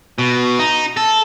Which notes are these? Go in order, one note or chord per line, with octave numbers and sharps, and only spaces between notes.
B2
D#4
A4